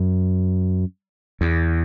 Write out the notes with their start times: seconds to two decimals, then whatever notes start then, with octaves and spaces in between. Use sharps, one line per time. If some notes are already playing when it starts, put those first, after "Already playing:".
Already playing: F#2
1.41 E2